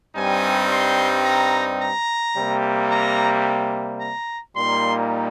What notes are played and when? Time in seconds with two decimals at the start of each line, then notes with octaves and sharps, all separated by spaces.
0.15 G2 G3 C4 D#4 G#5
0.71 C6
1.25 A#5
1.80 A#5
2.36 C3 G3 A#3
2.90 A#5
4.00 A#5
4.55 A#2 G3 A#3 D#4 C6